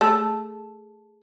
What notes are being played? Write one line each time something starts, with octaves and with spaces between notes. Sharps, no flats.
A3 G#4 A5 E6